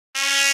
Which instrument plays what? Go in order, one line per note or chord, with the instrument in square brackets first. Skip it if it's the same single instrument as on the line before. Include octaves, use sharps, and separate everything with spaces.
[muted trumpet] C#4